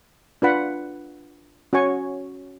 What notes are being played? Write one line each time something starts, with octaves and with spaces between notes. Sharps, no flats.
D4 F4 B4 F#5 B5
C#4 F#4 C#5 G#5 C#6